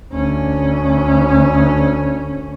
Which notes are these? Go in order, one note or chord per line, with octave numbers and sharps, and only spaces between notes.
D2 C#4